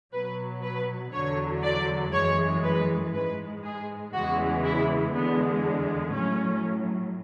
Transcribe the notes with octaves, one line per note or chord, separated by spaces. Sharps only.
B2 F#3 B4
B4
E2 D3 F#3 C#5
D5
F#2 E3 G#3 C#5
B4
G#2 G#3 B4
G#4
E2 C#3 E3 G#3 F#4
E4
E2 D3 G#3 B3
A2 F#3 C#4